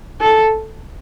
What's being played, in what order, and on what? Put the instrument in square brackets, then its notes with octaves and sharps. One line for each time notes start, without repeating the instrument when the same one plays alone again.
[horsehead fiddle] A4